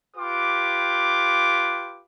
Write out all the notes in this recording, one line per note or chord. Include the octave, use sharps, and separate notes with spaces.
F4 G4 B4 D6